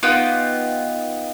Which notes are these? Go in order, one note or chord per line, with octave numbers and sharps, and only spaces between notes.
B3 D#4 F4 G4